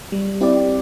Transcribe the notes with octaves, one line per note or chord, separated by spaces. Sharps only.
G3
C4 E4 G4 D5